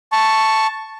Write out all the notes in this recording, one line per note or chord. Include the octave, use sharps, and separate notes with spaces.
A5 C#6